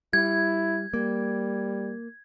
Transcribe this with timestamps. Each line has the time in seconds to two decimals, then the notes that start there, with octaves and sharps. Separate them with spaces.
0.13 G3 E4 G#6
0.94 G3 A#3